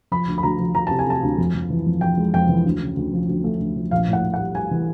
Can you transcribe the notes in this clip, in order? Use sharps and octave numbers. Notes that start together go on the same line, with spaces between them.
F3 B5
D2
B5
D2 A#5
F3
F3 A#5
C3 A5
G#5
C3 A5
D2
F2
F2
E3
F2
F2 G5
G#3
F2 G5
E3
D2
C#3
D2
F3
D2
A3
D2
F3
A#1 F5
A2
F#5
A2
F#5
G3
G3 G#5
E3